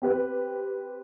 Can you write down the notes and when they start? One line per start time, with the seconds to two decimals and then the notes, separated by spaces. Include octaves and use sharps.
0.02 C4 G4 B4